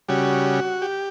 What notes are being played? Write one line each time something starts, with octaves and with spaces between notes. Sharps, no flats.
C#3 G3 F#4
G4